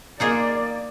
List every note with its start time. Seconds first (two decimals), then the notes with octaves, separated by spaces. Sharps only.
0.20 A#3 D#4 F4 G#4 D5